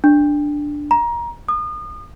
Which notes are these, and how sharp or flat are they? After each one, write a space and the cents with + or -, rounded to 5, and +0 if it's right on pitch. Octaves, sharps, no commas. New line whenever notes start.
D4 +0
A#5 +25
D#6 -35